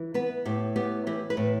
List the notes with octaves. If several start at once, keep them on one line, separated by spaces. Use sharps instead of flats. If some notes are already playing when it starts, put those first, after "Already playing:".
Already playing: E3
B3 B4
A2 G4
B3 G4
E3 G4
B4
A2